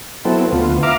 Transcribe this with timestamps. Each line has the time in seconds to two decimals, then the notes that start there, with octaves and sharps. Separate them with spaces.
0.25 F#3 B3 C4 E4 A4
0.52 D2 B3 F4
0.83 E5 F5 A#5 D6 F6